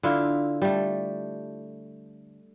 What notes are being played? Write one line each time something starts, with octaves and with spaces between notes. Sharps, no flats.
D3 E4 F4
G3 A3